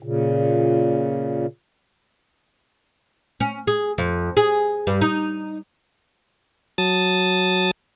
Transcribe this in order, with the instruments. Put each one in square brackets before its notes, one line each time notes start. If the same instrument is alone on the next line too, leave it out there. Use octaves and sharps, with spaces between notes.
[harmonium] A#2 C#3
[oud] C#4
G#4
F2
G#4
G2
D#4
[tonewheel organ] F#3 A5 D#6 A6